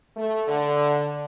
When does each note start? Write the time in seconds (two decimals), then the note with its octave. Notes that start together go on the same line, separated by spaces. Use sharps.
0.17 A3
0.48 D3